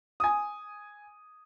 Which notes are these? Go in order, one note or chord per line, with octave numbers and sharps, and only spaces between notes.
G#5 D#6